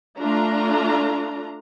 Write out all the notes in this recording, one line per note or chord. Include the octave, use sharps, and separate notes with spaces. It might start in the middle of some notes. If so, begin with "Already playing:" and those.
A3 D4 F4 A#5